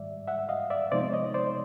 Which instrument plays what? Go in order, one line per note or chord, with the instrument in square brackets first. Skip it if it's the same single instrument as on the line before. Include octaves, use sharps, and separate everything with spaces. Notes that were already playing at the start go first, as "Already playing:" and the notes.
Already playing: [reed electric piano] G#2 D#3 G3 D5 E5
E5 F#5
D#5 F5
D5 E5
C3 F3 G#3 B3 D#4 C5 D5
C#5 D#5
C5 D5